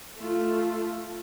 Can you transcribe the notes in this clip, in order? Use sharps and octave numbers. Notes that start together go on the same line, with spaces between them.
A3 F4